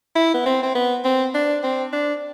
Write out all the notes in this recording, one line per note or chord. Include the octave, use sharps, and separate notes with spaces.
E4
B3
C4
C4
B3
C4
D4
C4
D4